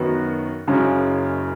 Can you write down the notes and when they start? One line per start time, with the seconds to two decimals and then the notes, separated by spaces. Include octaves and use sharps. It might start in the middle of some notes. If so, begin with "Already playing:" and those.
Already playing: F#2 D#3 B3 F#4
0.68 F#1 F#2 C#3 G#3 C#4